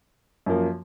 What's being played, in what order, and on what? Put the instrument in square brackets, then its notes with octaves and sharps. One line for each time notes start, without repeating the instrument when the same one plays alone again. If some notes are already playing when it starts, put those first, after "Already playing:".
[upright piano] F#2 F3 A#3